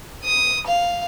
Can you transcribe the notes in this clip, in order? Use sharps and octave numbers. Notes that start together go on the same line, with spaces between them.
D#6
F5